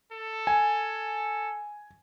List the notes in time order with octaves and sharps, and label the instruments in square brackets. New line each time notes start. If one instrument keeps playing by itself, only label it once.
[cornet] A4
[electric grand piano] G#5